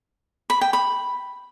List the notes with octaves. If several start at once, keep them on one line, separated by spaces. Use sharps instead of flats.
B5
G5
B5